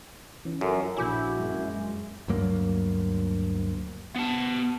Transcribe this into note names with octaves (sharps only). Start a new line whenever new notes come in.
E3 C#4
F#2 F4 A4 A#4
A#1 E4 F#4 G#5 D6 G6
F#2 G#3
D2 G2 F#3 A#3
B3 A5